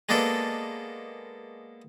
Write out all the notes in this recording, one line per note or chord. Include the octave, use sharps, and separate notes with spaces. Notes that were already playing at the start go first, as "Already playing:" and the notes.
G#3 A#3 B3 D4 A4